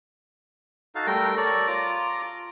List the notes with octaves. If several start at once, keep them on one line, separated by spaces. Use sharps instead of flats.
D#4 F#4 A4 F5
G3 A3 A#4 G5
A4 A#4 C#5 D5
F4 A#5 D6